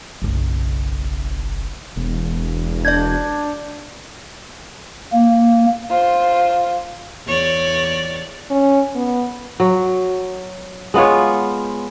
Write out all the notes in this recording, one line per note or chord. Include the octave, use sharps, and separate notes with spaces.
F#1 B1
E1
D4 D5 G6 G#6
A#3
F4 C5
E2 C#5 D5
C#4
B3
F#3
G#3 B3 F4 C#5